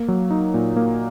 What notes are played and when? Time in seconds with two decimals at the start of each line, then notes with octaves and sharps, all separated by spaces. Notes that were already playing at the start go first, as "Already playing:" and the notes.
Already playing: A#3
0.08 F#3
0.31 D#4
0.54 A#2
0.76 A#3